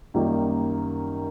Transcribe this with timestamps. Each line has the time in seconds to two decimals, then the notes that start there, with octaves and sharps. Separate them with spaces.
0.14 F#2 D#3 G3 A#3 D#4